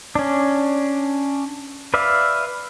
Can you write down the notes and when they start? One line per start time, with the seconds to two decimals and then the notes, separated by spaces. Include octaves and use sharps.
0.15 C#4 D4
1.94 B4 D5 E5 F5